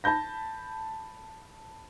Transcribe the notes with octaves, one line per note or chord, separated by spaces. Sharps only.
A5 B5 G6 A#6